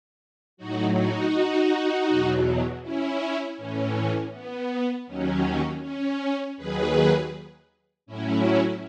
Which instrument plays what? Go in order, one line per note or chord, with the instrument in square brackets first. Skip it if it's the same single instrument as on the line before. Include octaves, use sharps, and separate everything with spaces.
[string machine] A2 F#3 D#4 F#4
D#4 F#4
E2 B2 F#3
C#4 E4
A2 E3 C#4
B3
D#2 D#3 F#3 C#4
C#4
D#2 D#3 F#3 G#4 B4
A2 F#3 C#4 E4